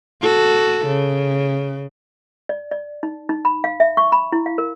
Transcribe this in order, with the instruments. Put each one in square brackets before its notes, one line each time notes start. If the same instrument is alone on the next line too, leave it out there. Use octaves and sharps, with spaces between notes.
[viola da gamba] F#4 A4
C#3
[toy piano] D5
D5
D#4
D#4
B5
F5
E5
C#6
B5
E4
F5
A#4